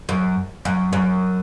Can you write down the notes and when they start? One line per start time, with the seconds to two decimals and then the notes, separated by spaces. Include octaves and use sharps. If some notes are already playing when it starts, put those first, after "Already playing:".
0.09 F#2
0.65 F#2
0.93 F#2